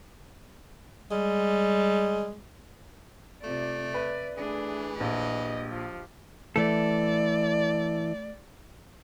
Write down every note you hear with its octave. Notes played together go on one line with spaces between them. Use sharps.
G3 G#3
C3 A3 F4 D5
B4 E5
E3 A3 D4 G#4
A#1 G4 D#5
F3
E3 A3 A4 D5